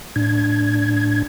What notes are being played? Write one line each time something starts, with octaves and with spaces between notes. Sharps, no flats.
A2 D4 G#6